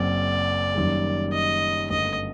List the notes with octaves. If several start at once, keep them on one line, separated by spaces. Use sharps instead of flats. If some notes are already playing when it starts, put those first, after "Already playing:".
Already playing: F#1 F#2 F#3 C4 D5
F#1 F#2 D#3 G3
D#5
G1 F#2 F#3 A3 D#5